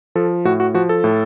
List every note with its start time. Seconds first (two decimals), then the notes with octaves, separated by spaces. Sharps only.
0.15 F3 A4
0.45 A2 F#4
0.60 F#4
0.74 F3 F#4
0.89 A4
1.04 A2